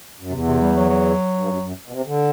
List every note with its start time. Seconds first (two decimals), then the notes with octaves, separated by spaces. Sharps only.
0.21 F#2
0.31 E2 C3
0.47 C3
0.61 G3
0.76 F#3
0.90 F#3
1.37 G2
1.48 F#2
1.62 F#2
1.88 B2
1.91 C3
2.06 D3